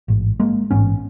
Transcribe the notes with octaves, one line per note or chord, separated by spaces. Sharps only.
A1 G#2
G#3 A#3
A1 G#2 B3 C#4